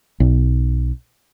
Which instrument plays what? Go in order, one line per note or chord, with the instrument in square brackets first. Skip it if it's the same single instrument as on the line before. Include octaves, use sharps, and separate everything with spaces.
[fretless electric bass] B1